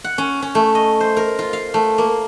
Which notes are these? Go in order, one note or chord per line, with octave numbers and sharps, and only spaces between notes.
F#5
C#4
C#4
A3
D#5
C5
A#4
F4
F5
A3
A#3